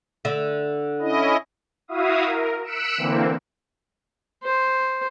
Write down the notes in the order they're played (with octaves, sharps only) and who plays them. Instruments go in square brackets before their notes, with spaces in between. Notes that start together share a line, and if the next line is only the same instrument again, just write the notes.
[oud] D3 E5
[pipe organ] C#4 E4 D#5
[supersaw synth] E4 F#4 E5 F5 D#6
A#4
E6 F#6 B6 C#7 D7 E7
D3 E3 A#3 C4
[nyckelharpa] C5